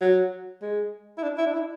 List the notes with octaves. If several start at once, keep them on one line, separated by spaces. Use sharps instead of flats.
F#3
G#3
E4
D4
E4
D4
E4